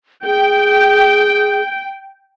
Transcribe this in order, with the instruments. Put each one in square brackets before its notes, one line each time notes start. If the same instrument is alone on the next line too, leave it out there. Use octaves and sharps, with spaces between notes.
[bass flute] G#4 [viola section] G5